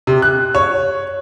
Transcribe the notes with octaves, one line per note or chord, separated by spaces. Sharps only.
C3
F#6
C#5